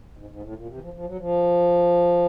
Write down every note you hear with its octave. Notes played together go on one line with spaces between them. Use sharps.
G#2
G#2
A2
A#2
C3
E3
F3
F3
F#3
F3